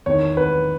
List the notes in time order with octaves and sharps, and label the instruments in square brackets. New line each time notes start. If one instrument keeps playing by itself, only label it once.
[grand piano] E2 D#3 C#5
B4